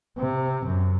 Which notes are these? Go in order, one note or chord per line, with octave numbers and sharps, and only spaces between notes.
C3
F#2